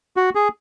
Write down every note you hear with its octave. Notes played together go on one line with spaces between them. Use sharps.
F#4
G#4